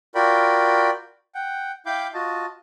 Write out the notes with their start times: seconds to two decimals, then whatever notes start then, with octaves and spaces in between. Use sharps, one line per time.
0.15 F4 F#4 A#4 D5 G5 B5
1.35 F#5 G5
1.86 E4 F5 G5 B5 D6 G6
2.14 F4 F#4 D#5 A5